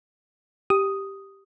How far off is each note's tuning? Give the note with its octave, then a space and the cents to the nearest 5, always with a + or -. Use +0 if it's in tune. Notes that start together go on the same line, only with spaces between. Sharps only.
G4 +0 D#6 +0